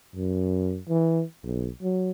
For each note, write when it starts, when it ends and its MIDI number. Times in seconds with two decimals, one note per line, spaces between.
0.15 0.79 42
0.89 1.23 52
1.44 1.70 35
1.82 2.11 54